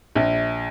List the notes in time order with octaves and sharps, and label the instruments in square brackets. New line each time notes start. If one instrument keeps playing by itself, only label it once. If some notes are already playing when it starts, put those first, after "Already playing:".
[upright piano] A#1